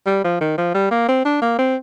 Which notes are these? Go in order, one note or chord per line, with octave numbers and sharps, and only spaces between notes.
G3
F3
D#3
F3
G3
A#3
C4
D4
A#3
C4